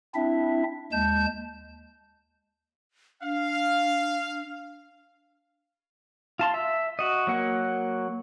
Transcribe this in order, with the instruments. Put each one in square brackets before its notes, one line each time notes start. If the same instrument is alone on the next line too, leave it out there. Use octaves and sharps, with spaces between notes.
[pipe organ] C4 D4 E4 E5
D#2 G#3 A5 G6
[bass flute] D4 [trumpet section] F5
[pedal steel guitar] F4 A5 C6
E5
F#4 D#5
F#3 A#3 F#5